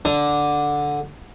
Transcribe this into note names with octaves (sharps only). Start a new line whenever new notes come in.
D3